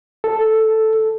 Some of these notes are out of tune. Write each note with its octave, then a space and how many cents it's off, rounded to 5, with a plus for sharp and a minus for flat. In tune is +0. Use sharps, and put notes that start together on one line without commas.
A4 +0